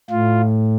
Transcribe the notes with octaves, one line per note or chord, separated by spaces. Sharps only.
A2 F4